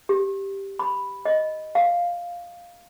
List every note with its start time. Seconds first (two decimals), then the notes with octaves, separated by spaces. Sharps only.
0.09 G4
0.79 B5
1.25 D#5
1.75 F5